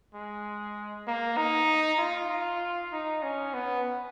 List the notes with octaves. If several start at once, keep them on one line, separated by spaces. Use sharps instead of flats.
G#3
A#3
D#4
F4
D#4
C#4
B3